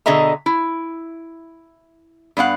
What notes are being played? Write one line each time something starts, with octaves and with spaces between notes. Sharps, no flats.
B2 D3 G#4 D#5 E5 A#5
E4
G2 B3 F5 F#5